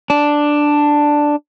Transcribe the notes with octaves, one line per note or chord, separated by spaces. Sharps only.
D4